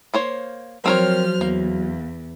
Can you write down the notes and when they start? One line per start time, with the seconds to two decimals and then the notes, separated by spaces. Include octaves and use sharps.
0.14 A#3 C5 C#5
0.86 F3 F#3 C4 A#4 C5 C#5 F6
1.41 E2 A#3